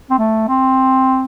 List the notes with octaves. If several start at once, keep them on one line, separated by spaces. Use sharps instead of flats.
C4
A3
C4